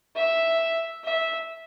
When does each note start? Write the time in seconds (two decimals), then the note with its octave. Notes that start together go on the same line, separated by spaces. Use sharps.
0.16 E5
1.04 E5